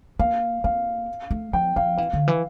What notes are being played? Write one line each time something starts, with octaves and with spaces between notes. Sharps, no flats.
A#3 F5
A#3 F5
A3
F3 G5
F3 F5
E3 F5
D3
E3